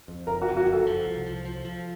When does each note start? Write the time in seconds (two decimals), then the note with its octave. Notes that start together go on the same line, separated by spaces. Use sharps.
0.08 F2
0.27 F#1 A#4
0.42 F#4
0.47 F2
0.57 F#4
0.67 F#1
0.72 A4
0.86 F3
1.06 C2
1.26 F3
1.45 F3
1.65 F3